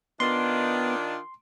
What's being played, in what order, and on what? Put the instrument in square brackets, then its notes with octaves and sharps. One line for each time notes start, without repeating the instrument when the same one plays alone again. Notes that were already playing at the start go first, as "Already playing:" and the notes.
[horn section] D#3 [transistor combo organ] B3 [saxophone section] D4 F4 [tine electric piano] C6